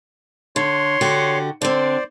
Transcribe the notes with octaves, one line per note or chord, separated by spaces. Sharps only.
D3 C#5 C6
D3 F#4 G4
D3 C4 C5 D5